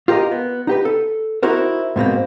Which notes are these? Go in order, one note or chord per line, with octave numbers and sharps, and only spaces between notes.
F4 G4 A#4 D5 D#5
B3
D#4 G4 B4
A4
D#4 E4 F#4 A#4 C5
G#2 B2 A#3 C4